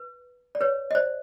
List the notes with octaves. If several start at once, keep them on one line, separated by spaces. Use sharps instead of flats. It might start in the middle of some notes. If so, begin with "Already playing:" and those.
Already playing: B4
D5
B4 C#5
D#5
C5 D5